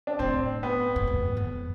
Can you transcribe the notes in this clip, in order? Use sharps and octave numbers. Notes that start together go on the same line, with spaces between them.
D4
A2 C4
B3
F2
G#2
F2